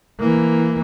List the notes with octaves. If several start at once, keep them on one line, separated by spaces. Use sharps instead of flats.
E3 A#3